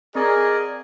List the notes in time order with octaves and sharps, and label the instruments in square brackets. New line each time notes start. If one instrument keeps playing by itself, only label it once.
[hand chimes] C4 A#5 [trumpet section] G#4 [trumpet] A#4 [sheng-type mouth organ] D5 D#5